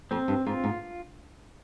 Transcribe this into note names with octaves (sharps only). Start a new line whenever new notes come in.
F2 C4
G2
G#2 F4
G#2